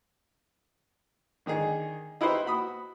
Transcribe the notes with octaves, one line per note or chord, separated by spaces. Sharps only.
D3 D#3 D#4 G#4
D#4 E4 G4 B4 C5
F#4 B5 D#6